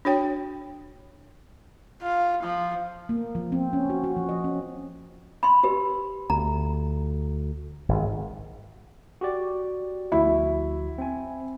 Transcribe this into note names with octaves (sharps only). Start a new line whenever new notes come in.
D4 F#4 C#5 G5
F4
F3
A#3
F3
C4
C#4
F#4
F#4
F3
D#5
C#4
B5 C6
G4 B4
D2 A#5
G#1
F#4 G4 D5
D2 F3 E4 F#4
C4 G#5